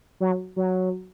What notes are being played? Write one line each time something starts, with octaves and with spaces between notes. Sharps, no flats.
F#3
F#3